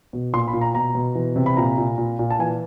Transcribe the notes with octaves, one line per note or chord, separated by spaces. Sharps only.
B2
A#2 C6
B5
A#2
A#5
B2 A#5
B2
E3
C3
B5
A#2 A#5
A#2
A#2
A#2
A5
E3 G#5